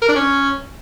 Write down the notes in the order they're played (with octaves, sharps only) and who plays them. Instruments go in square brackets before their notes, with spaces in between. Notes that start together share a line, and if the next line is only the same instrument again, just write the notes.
[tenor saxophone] A#4
D4
C#4